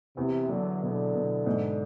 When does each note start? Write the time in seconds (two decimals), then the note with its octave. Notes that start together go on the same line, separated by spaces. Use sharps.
0.17 E2 C3
0.49 D3 F#3
0.82 B2 D3
1.14 B2
1.46 G#2